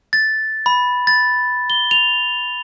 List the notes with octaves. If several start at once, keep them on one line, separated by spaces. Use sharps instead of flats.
A6
B5
A6
G7
F7